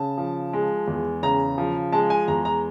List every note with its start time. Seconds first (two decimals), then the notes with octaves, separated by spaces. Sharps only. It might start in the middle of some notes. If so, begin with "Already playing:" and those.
Already playing: C#3 A5
0.18 F3
0.53 G#3
0.88 E2
1.23 C#3 A#5
1.58 F3
1.92 G#3 A5
2.10 G#5
2.28 E2 A#5
2.45 A#5